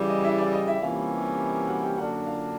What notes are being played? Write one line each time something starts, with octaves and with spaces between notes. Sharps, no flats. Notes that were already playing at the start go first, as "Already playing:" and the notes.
Already playing: C#3 E3 G3
D#5
E4 E5
D5
D#5
E4 E5
C3 E3 G3 A#3 C#4 F4 F5
F#4 F#5
G4 G5
F#2 D3 F#3 A#3 D4 F#4 F#5
F4 F5